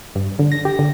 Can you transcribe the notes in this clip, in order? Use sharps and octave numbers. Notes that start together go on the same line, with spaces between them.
G2
D3
A#6
G4
D3